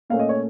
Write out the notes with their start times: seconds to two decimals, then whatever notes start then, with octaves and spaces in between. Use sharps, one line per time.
0.10 A#2 A3 C#4 F5
0.19 D#5
0.29 C#5